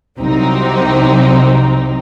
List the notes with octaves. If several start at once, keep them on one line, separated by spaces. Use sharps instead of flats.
C2 C3 F#3 C4 D#4